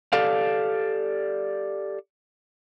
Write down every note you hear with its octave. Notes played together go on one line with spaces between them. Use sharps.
G4 A4 D5 F5